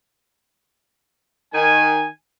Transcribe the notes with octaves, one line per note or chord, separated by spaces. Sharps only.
D#3 G#5